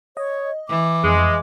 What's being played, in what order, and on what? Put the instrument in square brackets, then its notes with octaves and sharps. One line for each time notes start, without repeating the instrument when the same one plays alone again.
[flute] C#5 [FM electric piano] D#5
[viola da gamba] E3 [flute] D6
[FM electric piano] F2 [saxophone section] G#3